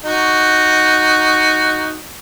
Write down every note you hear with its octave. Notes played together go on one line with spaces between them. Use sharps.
D#4 F#4